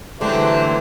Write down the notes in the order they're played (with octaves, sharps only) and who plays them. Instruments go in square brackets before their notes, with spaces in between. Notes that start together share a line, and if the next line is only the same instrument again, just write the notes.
[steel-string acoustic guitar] D3 A3 [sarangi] E3 [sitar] F#3 C4 D4 [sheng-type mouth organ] G4 C5